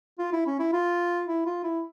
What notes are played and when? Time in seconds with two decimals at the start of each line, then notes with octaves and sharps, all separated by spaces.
0.18 F4
0.32 E4
0.46 C#4
0.59 E4
0.73 F4
1.27 E4
1.46 F4
1.63 E4